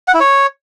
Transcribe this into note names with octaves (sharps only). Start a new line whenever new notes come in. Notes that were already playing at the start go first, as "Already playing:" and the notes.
F#5
E4
C#5